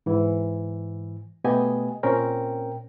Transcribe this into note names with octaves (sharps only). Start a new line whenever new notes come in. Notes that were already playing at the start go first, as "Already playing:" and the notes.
G#2 E3
B2 A3 B3 G4 D#5 G#5
A#2 C4 C#4 A#4 G5